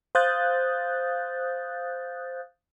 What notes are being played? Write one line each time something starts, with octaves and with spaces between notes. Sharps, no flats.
C5 F5 D#6 F#6 G6 A6